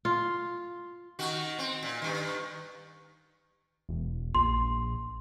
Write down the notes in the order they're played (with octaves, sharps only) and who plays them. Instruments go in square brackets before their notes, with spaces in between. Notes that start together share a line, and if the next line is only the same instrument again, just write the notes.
[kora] F4
[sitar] D#3 F#4
C4
A#2
G2 D#3
[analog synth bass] E1
[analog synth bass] A#1 [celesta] C6